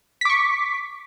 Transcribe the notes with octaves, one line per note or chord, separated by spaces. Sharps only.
C#6 D6 B6